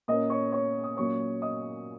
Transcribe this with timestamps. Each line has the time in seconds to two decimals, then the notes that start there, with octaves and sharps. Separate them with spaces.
0.08 A#2 A#3 C#4 D#5 D#6
0.30 C#5 C#6
0.52 C#5 C#6
0.84 D#6
0.97 A#2 F#3 C#4 C#5 C#6
1.42 D#5 D#6